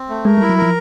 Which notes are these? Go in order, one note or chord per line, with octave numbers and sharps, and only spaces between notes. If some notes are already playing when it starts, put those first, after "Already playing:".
Already playing: C4
A3
G#3 A#4
G3 E4
F#3
F3 A#4